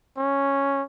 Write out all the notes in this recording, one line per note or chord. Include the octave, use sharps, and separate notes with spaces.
C#4